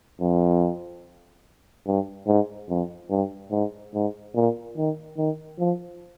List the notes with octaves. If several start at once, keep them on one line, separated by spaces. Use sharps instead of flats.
F2
G2
G#2
F2
G2
G#2
G#2
A#2
D#3
D#3
F3